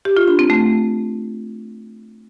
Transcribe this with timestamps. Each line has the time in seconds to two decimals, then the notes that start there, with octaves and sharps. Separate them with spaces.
0.05 G4
0.17 F4
0.28 D4
0.39 C4
0.50 A3